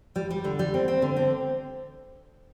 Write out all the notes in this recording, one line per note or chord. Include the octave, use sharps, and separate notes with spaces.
G3
G3
D3
G3
C4
C4
D3
C4